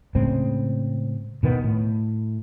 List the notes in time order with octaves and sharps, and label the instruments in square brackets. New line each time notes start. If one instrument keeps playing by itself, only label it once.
[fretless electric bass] A2 C#3 G#3 C4
B2 D#3 B3
A2